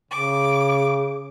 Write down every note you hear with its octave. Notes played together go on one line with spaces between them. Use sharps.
C#3 D6